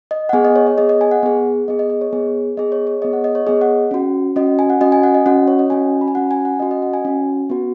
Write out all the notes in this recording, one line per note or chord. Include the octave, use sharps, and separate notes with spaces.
D#5
F#5
B3 G#4 G#5
D#5
C#5
D#5
B3 G#4 D#5
D#5
G#5
F#5
B3 G#4
B3 G#4 D#5
D#5
D#5
C#5
B3 G#4
B3 G#4 D#5
C#5
C#5
B3 G#4 D#5
F#5
D#5
C#5
B3 G#4 D#5
F#5
C#4 F#4
C#4 F#4 D#5
G#5
F#5
C#4 F#4 D#5
G#5
F#5
D#5
C#4 F#4 F#5
C#5
D#5
C#4 F#4 G#5
B5
G#5
C#4 F#4 F#5
G#5
F#5
C#4 F#4 D#5
D#5
F#5
G#5
C#4 F#4
B3 F#4